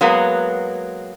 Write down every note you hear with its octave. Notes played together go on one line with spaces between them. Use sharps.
F#3 G#3 A#3 B3